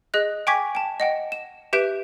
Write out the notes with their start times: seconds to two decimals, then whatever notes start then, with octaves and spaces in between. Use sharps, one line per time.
0.14 G#4 D#5 F#6
0.47 G5 G#5 C#6 D6 G#6 B6
0.75 G5 A5
1.00 D#5 F#5 G5
1.32 E7
1.73 G4 B4 E5 G6 D7 E7